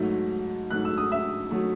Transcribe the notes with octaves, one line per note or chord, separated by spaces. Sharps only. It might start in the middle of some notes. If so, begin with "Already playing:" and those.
Already playing: G#2 F#3 A3
G#2 F#3 A3 F#6
E6
D#6
E5 E6
F#3 A3